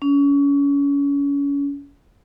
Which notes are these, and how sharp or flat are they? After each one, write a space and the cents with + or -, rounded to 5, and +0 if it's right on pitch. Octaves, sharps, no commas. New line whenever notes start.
C#4 +30